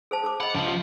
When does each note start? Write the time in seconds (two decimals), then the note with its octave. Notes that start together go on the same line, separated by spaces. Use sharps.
0.11 G#4 C5 A5
0.24 G#4 C5 D6
0.40 D#5 F#5 B5
0.55 C#2 F3 A5
0.67 F4